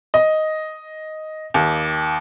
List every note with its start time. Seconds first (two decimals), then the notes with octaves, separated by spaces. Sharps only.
0.14 D#5
1.54 D#2